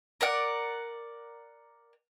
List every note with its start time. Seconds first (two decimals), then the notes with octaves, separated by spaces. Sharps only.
0.21 A#4 D5 F#5